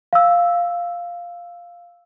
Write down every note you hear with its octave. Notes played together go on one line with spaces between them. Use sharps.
F5 E6